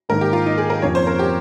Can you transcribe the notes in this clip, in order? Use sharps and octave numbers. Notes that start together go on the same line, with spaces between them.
G#2 D#3 A#3 A#4
G4
F4
D#4
G#4
A#4
F2 C#3 F3 A#3 C#4 C#5
C5
A#4
G4